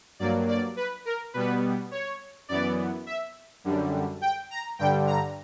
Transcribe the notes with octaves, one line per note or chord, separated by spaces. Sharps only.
G2 F#3 A#3 D5
D5
B4
A#4
B2 G3 B3 B4
C#5
F#2 E3 B3 D5
E5
F#2 D3 G3
G5
A#5
G2 D3 G3 G5
A#5